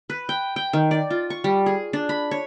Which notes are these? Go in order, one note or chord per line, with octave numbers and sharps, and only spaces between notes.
B4
G5
G5
D#3
D5
F4
C#6
G3
G#4
D4
B5
C#5